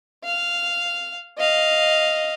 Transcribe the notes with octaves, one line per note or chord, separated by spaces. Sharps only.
F5
D#5 F5